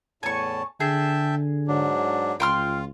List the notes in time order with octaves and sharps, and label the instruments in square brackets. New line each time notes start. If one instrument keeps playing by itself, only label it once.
[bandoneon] E2 A2 A5 [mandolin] G#5 C#6
[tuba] D3 [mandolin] G#4 [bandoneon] E5 G5 A5
[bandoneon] G#2 F#3 D4
[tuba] C#2 [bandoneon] F4 [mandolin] G5 C6 F6